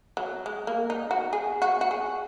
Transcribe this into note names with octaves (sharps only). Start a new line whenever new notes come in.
F#3
G#3
A#3
D#4
F#4
G#4
F#4
F#4
G#4